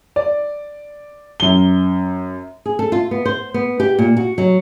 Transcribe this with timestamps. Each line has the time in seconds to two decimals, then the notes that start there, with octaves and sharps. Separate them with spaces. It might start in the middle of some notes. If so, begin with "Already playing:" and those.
0.16 D5
1.40 F#2 G7
2.66 G#4
2.79 A4
2.92 F4
3.11 B3
3.26 C5
3.54 B3
3.80 G4
3.99 A#2
4.17 F#4
4.38 F#3